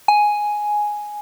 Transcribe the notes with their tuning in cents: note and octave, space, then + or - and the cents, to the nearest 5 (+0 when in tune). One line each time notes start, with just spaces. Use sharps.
G#5 +5